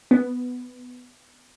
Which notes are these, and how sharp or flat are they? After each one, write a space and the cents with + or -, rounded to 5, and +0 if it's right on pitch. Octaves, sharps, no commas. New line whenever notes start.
B3 +5